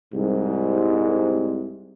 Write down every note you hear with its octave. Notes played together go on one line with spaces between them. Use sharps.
C2 G#2